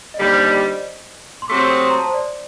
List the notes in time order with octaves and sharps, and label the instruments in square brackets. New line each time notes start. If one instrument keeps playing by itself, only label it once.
[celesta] D#5
[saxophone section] D#2 D3 G3 [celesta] D5
[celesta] C5
D5
D#5
D5
C6
[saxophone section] C3 F#3 A3 C4 F#4 [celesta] D6
[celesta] C6
D#6
C6
A#5
A5
C5
D5